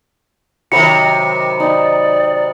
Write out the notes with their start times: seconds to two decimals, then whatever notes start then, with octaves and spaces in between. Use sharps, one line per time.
0.72 C3 D#3 F#3 B4 E5 C#7
1.60 D#4 D5